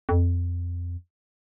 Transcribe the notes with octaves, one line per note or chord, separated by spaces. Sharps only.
F2